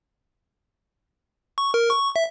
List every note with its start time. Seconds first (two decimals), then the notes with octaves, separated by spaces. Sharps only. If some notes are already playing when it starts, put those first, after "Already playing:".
1.58 C#6
1.74 A#4
1.91 C#6
2.16 E5